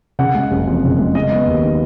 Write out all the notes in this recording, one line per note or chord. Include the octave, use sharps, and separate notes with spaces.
C#3 F#5
G#3
F#1
F2
C#3
G#3
G#3 D#5
B3
D#2
D#3